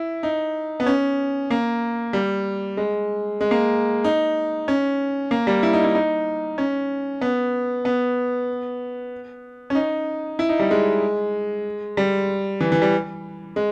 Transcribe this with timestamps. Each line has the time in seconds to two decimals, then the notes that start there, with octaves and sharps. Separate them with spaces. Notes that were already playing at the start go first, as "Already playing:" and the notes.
Already playing: E4
0.23 D#4
0.80 B3
0.86 C#4
1.50 A#3
2.13 G3
2.77 G#3
3.41 G#3
3.51 A#3
4.04 D#4
4.68 C#4
5.31 A#3
5.47 G3
5.63 E4
5.73 D#4
5.84 E4
5.95 D#4
6.58 C#4
7.21 B3
7.85 B3
9.70 C#4
9.75 D#4
10.39 E4
10.49 D#4
10.59 G3
10.71 G#3
11.97 G3
12.60 E3
12.72 E3
12.82 G3
13.56 G#3